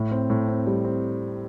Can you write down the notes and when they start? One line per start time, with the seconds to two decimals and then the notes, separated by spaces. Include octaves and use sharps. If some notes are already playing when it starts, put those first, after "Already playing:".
Already playing: A2
0.11 C4
0.30 A2
0.48 C4
0.67 G3
0.84 C4